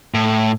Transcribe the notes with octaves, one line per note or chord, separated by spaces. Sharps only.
A2